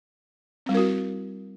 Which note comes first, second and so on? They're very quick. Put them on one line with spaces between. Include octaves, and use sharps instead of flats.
C4 G3 E4 A#4 F#4